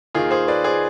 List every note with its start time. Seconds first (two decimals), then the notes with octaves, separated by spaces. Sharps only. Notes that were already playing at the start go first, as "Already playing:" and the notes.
0.15 D#2 D#3 F4 G#4
0.31 G#4 C5
0.48 B4 D5
0.64 G#4 C5